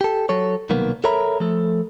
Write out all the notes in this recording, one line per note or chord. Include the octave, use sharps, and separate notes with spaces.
G4 A4
F#3 A4 C#5
C2 B2 D#3 F#3 A#3 B3
A4 A#4 C#5 E5 A#5 B5
F3 A3 A4